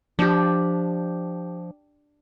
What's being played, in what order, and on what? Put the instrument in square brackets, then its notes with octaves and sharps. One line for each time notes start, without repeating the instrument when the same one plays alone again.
[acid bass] F3 [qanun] D4 G4